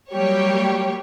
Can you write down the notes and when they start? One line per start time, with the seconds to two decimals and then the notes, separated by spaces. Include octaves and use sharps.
0.13 F#3 G3 A#3 G4 C#5